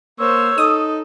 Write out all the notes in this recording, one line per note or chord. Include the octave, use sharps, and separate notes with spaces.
A#3 C5 C#5 E6
D#4 A4 D#6